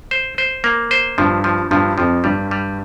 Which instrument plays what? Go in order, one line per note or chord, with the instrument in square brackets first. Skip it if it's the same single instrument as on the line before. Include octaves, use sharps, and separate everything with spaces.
[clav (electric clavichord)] C5
C5
A#3
C5
[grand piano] G2 [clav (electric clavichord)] F3
[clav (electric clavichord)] F3
[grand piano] G2 [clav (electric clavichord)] F3
[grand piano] F2 [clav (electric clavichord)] F3
[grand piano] G2 [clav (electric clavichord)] G3
[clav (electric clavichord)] G3